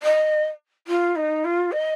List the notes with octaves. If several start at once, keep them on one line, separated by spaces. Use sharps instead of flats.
D#5
F4
D#4
F4
D#5